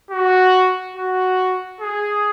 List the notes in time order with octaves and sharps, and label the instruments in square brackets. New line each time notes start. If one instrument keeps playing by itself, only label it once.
[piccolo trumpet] F#4
F#4
G#4